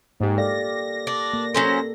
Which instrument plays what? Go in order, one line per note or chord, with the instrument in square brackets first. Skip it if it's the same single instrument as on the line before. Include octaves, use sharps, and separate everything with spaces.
[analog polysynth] G#2 [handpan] A#3 G4
[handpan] A4 D5 F5 [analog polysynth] A#6
[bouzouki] D4
[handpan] A#3
[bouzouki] F#3 C#4 C5 [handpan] A4